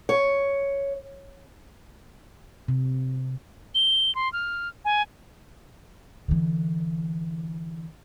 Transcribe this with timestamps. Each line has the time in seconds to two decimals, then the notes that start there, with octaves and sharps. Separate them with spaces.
0.09 C#5
2.68 C3
3.75 G7
4.15 C6
4.33 F6
4.85 G#5
6.28 D3 E3